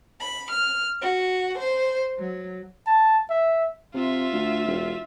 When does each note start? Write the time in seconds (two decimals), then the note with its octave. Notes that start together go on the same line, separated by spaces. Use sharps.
0.20 B5
0.50 F6
1.01 F#4
1.57 C5
2.18 F#3
2.86 A5
3.30 E5
3.94 C3 F4 E5
4.33 D2
4.68 E1